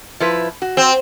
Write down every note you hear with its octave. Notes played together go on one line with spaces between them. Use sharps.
F3 E4 B4
F#4
C4